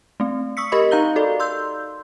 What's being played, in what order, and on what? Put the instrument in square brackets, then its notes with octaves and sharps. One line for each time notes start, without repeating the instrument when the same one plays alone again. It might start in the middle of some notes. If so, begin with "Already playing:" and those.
[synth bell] A3 C4
C#6 D#6 E6 B6 C#7
G4 A#4 D#5 B5 C#6
D#4 F5 A#5 G6 G7
F#4 A4 D5
C6 E6 G6